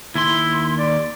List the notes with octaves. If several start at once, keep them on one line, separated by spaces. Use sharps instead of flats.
D#2 E4 C6
D5